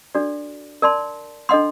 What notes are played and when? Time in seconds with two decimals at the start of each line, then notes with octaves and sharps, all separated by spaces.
0.15 D4 F#4 A4 D5
0.82 A#4 D5 A5 C6
1.49 D4 A4 D#5 F#5 C6